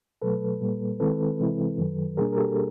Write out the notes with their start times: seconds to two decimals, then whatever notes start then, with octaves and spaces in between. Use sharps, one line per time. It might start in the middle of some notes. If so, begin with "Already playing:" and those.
0.22 B2 F#3 A3 A4 B4
0.61 A#2 G3 A#3
1.00 D#3 G#3 C4 E4 A4 B4
1.40 C3 E3 G#3 C4 E4
1.78 F#2 D#3 F#3
2.17 B2 G3 A#3 D4 G#4 A#4
2.32 A#4
2.37 G4 A4